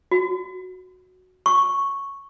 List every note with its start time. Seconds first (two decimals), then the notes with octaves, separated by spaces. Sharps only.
0.12 F#4
1.46 C#6